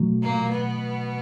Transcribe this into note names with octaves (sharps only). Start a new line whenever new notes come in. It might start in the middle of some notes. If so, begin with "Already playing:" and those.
Already playing: B2 F#3 A3
A#2 A#3
B2 B3